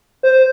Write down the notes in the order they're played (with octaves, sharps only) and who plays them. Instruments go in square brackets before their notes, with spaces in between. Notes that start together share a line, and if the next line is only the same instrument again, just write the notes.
[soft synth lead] C5